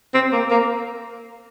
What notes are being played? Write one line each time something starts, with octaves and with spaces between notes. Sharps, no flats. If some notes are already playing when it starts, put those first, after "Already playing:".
C4
A#3
A#3